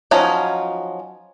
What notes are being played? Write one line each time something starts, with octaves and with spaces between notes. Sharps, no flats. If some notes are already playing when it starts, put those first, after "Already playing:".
F3 F#3 C#4 D#4